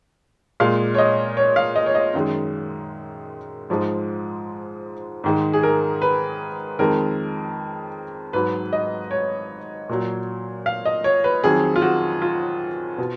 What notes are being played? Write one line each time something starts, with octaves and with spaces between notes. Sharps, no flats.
A#2 G#3 F5
C#5
D#5
C#5
F5
D#5
C#5
D#5
F#2 D#3 G#3
G#2 F3 G#3
G#2 D#3 G#3
G#4
A#4
B4
F2 D#3 G#3 A#4
G#2 F#3 B4
D#5
C#5
A#2 F#3
F5
D#5
C#5
B4
F2 D#3 F#3 G#4
F4
F#4
F4
B2